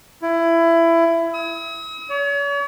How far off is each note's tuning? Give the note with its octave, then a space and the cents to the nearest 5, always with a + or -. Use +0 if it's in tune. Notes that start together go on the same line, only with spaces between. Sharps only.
E4 +20
D#6 +45
C#5 +40